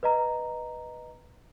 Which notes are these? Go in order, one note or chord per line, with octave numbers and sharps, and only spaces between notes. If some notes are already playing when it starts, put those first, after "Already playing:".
B4 D#5 A#5